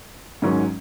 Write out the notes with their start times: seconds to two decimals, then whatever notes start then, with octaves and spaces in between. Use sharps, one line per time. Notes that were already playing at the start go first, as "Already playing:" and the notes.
0.42 G#2 D#3 F#3 C#4